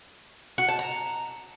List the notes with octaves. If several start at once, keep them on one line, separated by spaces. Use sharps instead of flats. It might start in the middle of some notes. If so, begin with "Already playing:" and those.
F#4
A5
A#5